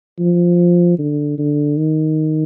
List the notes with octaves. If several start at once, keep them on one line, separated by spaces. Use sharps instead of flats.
F3
D3
D3
D#3